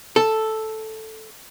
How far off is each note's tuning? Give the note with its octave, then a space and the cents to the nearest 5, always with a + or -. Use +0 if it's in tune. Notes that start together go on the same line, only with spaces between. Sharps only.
A4 +0